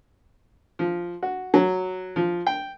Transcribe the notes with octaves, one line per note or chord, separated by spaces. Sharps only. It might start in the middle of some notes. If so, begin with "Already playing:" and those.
F3
F#4
F#3
F3
G5